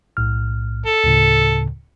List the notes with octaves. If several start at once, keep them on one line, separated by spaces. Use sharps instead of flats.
B1 A2 F6
A4
D2 A2 C#3